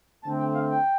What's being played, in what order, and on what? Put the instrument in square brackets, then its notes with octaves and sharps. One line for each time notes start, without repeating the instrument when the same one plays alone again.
[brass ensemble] D3 A3 C4 [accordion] A5
[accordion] G5
F5
G5